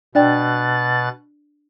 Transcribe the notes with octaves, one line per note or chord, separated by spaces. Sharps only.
B2 D4 D5 G5 F#6 A6